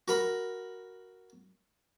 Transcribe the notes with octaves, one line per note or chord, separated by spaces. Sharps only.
F#4 A#4 B5